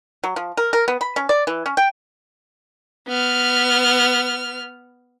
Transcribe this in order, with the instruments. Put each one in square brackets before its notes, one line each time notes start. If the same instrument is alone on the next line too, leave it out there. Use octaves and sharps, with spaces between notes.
[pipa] F#3
F3
A#4
A#4
B3
B5
C#4
D5
E3
C#4
G5
[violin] B3 F6